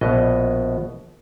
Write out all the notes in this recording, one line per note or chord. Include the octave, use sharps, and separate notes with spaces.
A#1 B2 B3 D#5